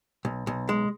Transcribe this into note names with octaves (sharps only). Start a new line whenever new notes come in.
B1
B1
G#3